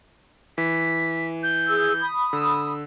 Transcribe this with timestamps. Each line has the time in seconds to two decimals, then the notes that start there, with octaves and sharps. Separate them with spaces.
0.58 E3 B6
1.43 G6
1.68 G#4 E6
2.01 B5 D#6
2.33 D3 E6